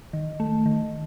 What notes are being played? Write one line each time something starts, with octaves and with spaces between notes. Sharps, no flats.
D#3
A3
D#3